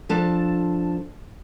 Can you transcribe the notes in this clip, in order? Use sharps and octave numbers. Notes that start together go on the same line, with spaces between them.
F3 D4 A4 A5